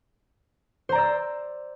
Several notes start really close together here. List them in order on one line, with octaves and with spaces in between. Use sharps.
C5 A#5 D5 E6